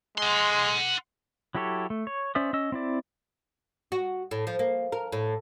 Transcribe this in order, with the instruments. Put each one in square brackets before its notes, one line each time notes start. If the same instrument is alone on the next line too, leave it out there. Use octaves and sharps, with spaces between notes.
[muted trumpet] G#3 [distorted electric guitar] F#5 C6
[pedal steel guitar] F#3 E4 G4 A4 C#5
A3
C#5
C#4 C5 D5 E5 D#6
C#4 D#5 E6
C4 E4 D5
[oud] F#4
A2
F3
A#3
A#4
A2